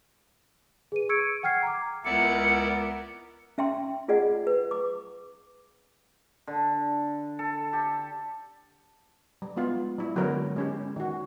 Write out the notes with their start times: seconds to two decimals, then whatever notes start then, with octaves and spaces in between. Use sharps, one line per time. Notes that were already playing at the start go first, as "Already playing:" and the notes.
0.92 G#4 B4 D#7
1.09 C#6 E6 G#6 C#7 D7
1.43 F#5 G5 F6 G#6 C7
1.63 A#5 D6
2.05 C#2 B3 E4 A#4 D5 C#7
3.58 C#4 E5 G5 C6
4.08 F4 G#4 D5 D#5 F#5
4.47 B4
4.71 D6
6.47 D3
7.39 A4
7.73 G4
9.42 G3
9.56 G#3 B3 F4
9.99 G3 E4
10.16 D3 F#3 G#3 B3 A#4 C#5
10.56 G#3 C#4 G4
10.96 D#3 F#4